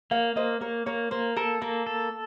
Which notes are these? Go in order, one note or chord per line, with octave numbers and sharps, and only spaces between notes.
A#3 C#5 F5
A#3 C5 D#5
A#3 A#4 C#5
A#3 A#4 C#5
A#3 C5
A4 A#4
A#3 A#4
A4